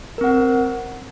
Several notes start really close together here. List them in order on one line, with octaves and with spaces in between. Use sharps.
A#4 C4 F#5